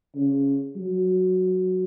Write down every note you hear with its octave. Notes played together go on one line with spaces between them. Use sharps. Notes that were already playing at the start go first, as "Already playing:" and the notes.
C#3
F#3